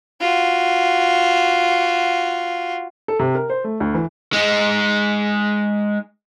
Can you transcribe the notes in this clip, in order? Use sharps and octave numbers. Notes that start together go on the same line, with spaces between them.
F4 F#4
A4
C3
A#4
C5
A3
D2
E3
G#3 D#4